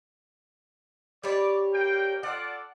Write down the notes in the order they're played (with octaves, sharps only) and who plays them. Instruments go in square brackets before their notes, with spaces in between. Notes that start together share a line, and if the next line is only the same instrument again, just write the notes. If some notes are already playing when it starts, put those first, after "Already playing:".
[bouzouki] G3 C#5 [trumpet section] D5
[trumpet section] A#3 G5
[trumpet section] F4 A4 D5 [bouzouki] F#5